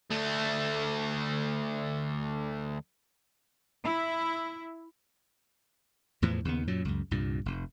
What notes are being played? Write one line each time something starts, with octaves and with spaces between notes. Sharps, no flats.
D2 A3
E4
E2 A2 E3 F3
D#2 C#3 B3
F#2 A#2 F#3
C#2 F#2
C2 G2 A#2
F1